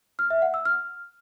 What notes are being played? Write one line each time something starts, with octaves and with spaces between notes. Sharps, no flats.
F6
E5
F#5
E6
F6